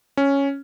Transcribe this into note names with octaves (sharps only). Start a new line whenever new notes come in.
C#4